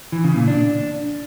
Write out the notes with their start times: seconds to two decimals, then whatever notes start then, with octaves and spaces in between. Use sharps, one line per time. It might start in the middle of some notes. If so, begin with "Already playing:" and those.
0.12 E3
0.24 C#3
0.36 A#2
0.48 D4